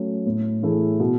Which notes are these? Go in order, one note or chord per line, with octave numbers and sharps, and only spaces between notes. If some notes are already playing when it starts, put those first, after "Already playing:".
Already playing: F#3 A3 C#4
A2
E3 A3 E4 G#4
B2